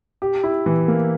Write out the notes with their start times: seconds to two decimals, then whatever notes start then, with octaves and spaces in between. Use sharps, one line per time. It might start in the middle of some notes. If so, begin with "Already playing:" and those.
0.22 G4
0.43 E4
0.66 E3
0.88 A#3